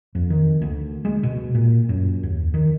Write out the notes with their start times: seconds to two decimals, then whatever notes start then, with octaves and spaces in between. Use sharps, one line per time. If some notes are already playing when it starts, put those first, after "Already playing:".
0.15 F2
0.30 D#3
0.61 D2
1.05 G#3
1.23 B2
1.55 A#2
1.89 F#2
2.23 D#2
2.54 D#3